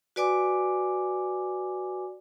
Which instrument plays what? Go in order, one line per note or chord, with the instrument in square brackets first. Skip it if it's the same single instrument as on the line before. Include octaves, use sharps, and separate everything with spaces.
[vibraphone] F#4 B4 D5 G#5 D6